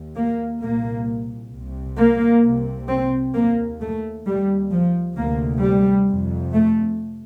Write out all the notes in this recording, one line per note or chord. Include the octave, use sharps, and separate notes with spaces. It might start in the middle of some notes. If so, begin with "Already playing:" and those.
Already playing: D#2
A#3
C2 A#2 A#3
C2 C3
A#3
C2 C3
C4
D#2 A#3
A3
D#2 G3
F3
D2 C3 A#3
G3
F2 C3
A3